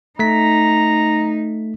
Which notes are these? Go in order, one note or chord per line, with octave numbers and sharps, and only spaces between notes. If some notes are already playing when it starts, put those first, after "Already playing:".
A3 D#4 A#5 B6